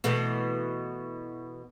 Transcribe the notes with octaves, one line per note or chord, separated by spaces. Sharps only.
B2 E3 A3